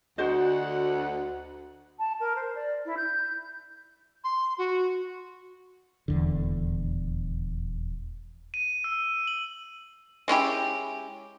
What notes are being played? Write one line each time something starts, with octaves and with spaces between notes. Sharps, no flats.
D2 F#4 C5 D#5 F#5
A5
A#4
C5
D5
E4
G6
C6
F#4
D#1 E2 D3
D#7
E6
F#7
G#3 C#4 E4 G4